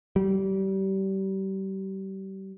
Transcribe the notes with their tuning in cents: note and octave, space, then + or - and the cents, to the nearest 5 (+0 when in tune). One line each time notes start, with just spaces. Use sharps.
G3 -30